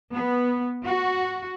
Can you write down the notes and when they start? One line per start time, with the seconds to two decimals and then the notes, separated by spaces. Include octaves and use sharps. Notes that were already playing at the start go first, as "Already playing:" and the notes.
0.12 B3
0.85 F#4